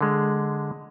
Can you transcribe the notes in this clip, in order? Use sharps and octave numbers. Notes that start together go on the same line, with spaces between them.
D3 G#3